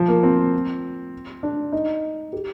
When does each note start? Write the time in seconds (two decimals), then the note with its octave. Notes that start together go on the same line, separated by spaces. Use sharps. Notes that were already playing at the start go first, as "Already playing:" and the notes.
Already playing: F3
0.08 A#3
0.23 C4
1.43 D4
1.72 D#4
2.33 G4